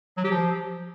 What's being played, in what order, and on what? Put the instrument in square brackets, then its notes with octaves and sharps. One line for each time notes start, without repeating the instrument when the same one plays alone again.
[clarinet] F#3
G4
F3